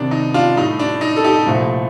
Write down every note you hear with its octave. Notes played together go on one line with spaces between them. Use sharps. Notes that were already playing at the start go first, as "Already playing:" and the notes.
Already playing: C2 C3 D#3 D4
D#4
D4 F4
A2 G3 D#4
D4
D#4
A4
D#4 G4
C2 A#2 F3 A3